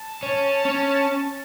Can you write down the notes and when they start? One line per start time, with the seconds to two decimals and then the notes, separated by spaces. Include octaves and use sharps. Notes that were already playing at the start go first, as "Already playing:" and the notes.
Already playing: A5
0.23 C#4
0.65 C#4